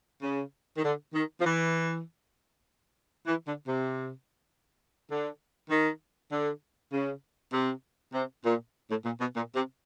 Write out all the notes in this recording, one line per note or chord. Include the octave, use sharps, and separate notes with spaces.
C#3
D#3
D3
D#3
F3
E3
E3
D3
C3
D3
D#3
D3
C#3
C3
C3
A#2
A2
A#2
B2
A#2
C3